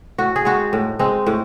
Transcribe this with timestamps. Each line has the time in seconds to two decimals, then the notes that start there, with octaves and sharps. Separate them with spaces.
0.18 A2 F#4
0.36 G#4
0.45 G#3 C4 D#4 F#4
0.73 A2
0.99 G#3 C4 D#4
1.27 A2